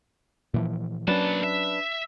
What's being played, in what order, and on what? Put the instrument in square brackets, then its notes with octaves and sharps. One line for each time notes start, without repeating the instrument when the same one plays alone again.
[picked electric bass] A#2 E3 F3
[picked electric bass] F#3 C#4 [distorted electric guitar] A#3 A5 [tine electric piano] D4 B4
[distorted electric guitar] E5